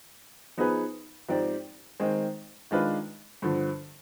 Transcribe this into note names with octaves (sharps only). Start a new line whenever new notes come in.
F3 B3 D#4 G#4 B4
G#2 F3 C4 G4 D5
D#3 G#3 C4
D#3 G#3 D4 F4 B4
G2 D3 F3